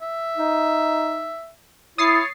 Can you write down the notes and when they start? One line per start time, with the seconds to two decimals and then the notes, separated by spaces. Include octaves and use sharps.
0.01 E5
0.37 D#4
1.98 E4 C#5 D#6 A6 C7